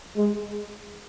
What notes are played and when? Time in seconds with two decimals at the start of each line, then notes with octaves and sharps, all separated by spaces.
0.16 G#3